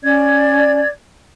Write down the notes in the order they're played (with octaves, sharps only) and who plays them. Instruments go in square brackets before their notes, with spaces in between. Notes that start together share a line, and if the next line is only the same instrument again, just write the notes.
[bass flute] C#4 [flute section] D5 G#6